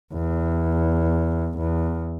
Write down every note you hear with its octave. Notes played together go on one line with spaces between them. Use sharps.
E2
E2